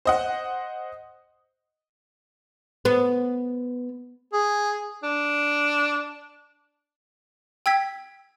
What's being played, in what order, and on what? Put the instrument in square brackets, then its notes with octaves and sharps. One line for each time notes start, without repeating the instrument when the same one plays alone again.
[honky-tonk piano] C5 D#5 F#5
[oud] B3
[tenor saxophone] G#4
D4
[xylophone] G5 E6 G#6 B6